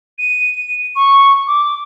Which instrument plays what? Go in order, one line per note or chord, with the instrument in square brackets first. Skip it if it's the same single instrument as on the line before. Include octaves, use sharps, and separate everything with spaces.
[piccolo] D#7
C#6
D6